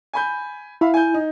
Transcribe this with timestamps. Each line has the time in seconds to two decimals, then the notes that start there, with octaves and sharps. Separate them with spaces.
0.13 G#5 B5 G6
0.81 E4 E5 F5 B5
0.94 G#5 G6
1.14 D#4